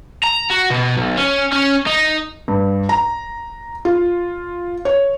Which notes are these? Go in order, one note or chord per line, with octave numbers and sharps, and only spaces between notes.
A#5
F#4
B2
B1
C#4
C#4
D#4
G2
A#5
F4
C#5